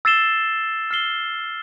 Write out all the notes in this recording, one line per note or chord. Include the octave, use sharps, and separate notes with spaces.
E6 A6 C7 E7 G7
F6 C7 G7